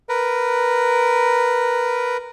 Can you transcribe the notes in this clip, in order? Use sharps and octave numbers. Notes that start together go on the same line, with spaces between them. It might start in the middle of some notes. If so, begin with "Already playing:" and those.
A#4 B4